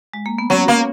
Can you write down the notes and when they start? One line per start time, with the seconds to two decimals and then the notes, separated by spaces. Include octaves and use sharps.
0.14 G#3
0.26 A#3
0.38 B3
0.50 F#3 C#4
0.68 A#3